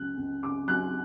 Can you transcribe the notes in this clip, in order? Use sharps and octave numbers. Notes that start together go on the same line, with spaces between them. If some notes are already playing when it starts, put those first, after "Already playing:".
Already playing: C#2 F#3 F#6
C#2
C#3 D6
F#3 F#6